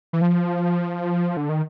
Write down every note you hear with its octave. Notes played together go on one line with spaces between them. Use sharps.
E3
F3
D3
D#3